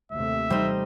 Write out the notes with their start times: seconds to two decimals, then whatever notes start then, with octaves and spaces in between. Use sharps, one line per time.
0.12 D#2 C3 A3 E5
0.50 G3 D#4 C5